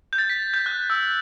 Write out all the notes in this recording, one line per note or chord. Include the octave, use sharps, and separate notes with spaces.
G6
A6
B6
G6
F#6
E6